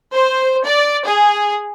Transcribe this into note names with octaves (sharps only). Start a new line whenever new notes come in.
C5
D5
G#4